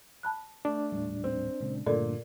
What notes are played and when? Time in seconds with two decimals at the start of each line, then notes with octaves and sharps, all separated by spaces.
0.23 A5 B5 F#6
0.65 A3 D4
0.92 D#1 A2 G3
1.24 C4
1.60 A#2 C#3 G#3
1.86 G2 A#2 D3 A3 A4 A#4 D5